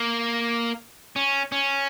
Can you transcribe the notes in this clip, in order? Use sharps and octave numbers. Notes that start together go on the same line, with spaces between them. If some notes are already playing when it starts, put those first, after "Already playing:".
Already playing: A#3
C#4
C#4